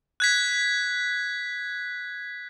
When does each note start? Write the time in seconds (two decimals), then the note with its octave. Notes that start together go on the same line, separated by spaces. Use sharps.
0.20 F#6 G#6 B6